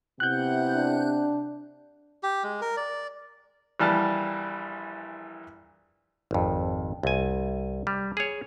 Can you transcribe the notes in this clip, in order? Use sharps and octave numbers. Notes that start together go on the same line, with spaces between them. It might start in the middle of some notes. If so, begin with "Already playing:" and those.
C3 B3 E4 F#5 F#6 G6
D4
G4
G#3
A#4
D5
A#1 E3 G3 A5 F6
G#1 F2
C2 G#5
G3
G#4 C#5